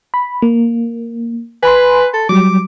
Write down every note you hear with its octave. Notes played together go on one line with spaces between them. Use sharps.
B5
A#3
B4 G#5 B5 C6
A4
F#3 G3 D6